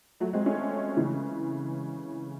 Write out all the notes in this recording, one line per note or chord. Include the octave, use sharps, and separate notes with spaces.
F#3 A3
G#3 C4
A3 C#4
C#3 E3